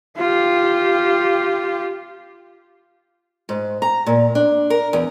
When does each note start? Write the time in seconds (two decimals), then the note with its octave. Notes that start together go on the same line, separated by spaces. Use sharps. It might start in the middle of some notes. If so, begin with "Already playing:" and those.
0.17 F4 G4
3.49 G#2
3.82 A#5
4.07 A#2
4.35 D4
4.70 A#4
4.93 E2